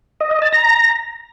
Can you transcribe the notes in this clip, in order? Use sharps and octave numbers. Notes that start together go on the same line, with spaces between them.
D#5
D#5
A5
A#5